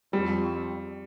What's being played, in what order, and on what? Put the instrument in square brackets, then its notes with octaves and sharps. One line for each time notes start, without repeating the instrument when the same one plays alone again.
[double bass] F2 [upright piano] G3